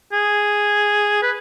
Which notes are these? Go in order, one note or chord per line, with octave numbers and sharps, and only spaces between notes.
G#4
B4